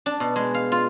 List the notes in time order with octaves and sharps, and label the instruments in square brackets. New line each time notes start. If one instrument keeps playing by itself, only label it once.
[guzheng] D4
B2
G#3
F5
F4